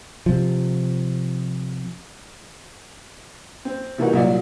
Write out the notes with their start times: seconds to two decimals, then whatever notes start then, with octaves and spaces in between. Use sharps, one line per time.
0.26 C3 F3
3.65 C4
3.98 C3 E3 G3 A#3 D#4 F#4
4.13 C2 A#2 F#3 D5